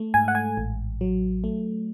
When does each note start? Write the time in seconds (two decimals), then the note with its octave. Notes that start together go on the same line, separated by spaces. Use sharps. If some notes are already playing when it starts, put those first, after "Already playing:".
Already playing: A3
0.14 G#2 G#5
0.28 F#5
0.35 G#5
0.57 A1
1.01 F#3
1.44 A3